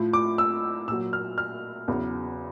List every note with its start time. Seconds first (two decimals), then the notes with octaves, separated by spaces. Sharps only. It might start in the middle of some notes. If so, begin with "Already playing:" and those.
Already playing: A2 F3
0.13 D6
0.38 E6
0.88 A#2 E6
0.92 F#3
1.13 F6
1.38 F6
1.88 E2 C#3 F#3